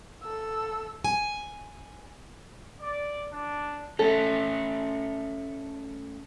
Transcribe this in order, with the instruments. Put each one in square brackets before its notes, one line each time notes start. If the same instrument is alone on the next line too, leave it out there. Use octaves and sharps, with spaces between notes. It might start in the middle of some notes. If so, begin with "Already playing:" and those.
[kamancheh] A4 E6
[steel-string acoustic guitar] G#5
[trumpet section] D5
D4
[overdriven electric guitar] A3 C#4 [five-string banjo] A4